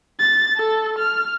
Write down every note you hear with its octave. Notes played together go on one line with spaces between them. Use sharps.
A6
A4
F6